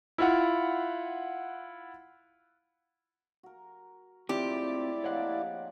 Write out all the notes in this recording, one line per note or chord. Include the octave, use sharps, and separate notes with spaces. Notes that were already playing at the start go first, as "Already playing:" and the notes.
E4 F4 F#5
F#4 A#4
A2 G#3 C4 D4 E4 F4 G4 D5
C3 F3 A#3 C#5 D#5 F#5